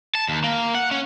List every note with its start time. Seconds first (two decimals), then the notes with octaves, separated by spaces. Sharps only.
0.15 A5
0.29 D#2
0.44 A#3
0.75 F#5
0.91 C#4